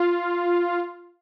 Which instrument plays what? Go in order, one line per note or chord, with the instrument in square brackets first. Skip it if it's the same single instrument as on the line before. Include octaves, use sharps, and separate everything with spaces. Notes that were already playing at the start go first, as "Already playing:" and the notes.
Already playing: [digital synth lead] F4